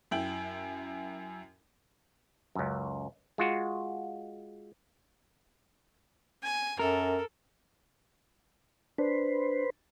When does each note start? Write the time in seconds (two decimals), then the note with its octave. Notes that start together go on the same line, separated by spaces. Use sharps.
0.11 F#2 E4 G5 F#7
2.55 C#2 F#2
3.38 G#3 F4 F#4
6.43 G#5
6.79 F#2 A4 A#4
8.98 D4 B4 C5